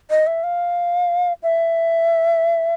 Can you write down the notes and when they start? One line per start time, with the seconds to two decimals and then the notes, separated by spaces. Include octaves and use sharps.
0.10 D#5
0.27 E5
0.44 F5
1.43 E5